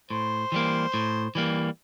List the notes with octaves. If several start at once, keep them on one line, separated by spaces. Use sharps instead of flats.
A2 C5
E3 G3 A#3
A2
E3 G3 A#3